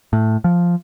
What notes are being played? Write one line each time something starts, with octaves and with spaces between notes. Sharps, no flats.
A2
F3